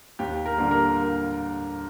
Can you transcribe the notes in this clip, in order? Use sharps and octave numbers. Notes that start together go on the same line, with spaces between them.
D#2 G4
A#4
D3 G3 A#3
A#4